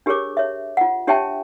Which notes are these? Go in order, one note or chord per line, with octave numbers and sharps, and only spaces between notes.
D4 G4 G#4 A#4 C#5 D6
C#5 E5
F4 F#5
D4 G4 C#5 E5 G5 A5